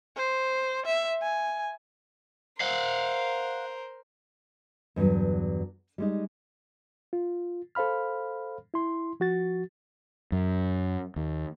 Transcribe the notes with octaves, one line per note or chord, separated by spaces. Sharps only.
C5
E5
G#5
A#4 C5 F5 F#5
E2 G2 D3 F#3
G3 G#3 D#4
F4
A4 C5 F5 B5 F6
E4 C6
F3 F#4 A6
F#2
D#2